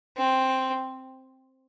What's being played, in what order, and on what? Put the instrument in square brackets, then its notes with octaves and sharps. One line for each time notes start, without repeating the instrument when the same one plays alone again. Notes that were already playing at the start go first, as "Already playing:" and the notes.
[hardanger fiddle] C4